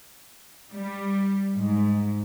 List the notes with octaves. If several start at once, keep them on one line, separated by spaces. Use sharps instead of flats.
G3
G#2